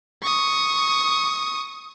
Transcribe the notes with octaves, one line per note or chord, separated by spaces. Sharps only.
C#6 D#6